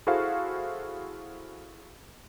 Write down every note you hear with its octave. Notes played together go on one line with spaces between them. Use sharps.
E4 F#4 G#4 A4 C5 F5